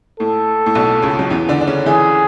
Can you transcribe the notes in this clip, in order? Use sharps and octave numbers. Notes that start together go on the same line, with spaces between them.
A2 A4
A2
B1 B2
C#2 C#3
F#3
E2 E3
D3 D4
D4
C#3 C#4
E3 E4 G#4